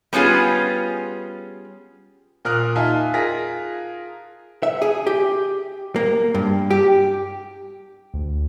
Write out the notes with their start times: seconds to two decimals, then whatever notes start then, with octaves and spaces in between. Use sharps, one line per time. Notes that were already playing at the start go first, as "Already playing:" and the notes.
0.13 G3 B3 C#4 F4 G#4
2.45 A#2 A#4 D#6 F6 F#6
2.76 D#4 F4 E5 F5 G#5 A5
3.14 F4 G#4 A#4 A#6 B6
4.63 E5
4.82 G#4
5.07 G4
5.96 A#3
6.34 G2
6.70 G4
8.14 D2